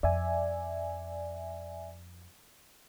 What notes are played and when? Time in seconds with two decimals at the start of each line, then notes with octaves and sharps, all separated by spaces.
0.03 F2 D5 E5 G#5